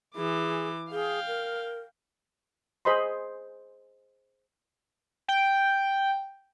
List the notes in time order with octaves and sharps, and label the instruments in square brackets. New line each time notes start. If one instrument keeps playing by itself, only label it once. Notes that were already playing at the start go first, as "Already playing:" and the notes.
[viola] E3 D6 [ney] G#4
[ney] G#4 [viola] F5 G5
[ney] A#4
[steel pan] G#4 C5 D#5 B5 C6
[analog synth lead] G5